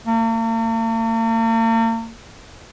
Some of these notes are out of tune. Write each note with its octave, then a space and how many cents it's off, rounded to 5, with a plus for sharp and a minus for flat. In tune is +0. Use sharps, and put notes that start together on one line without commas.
A#3 -45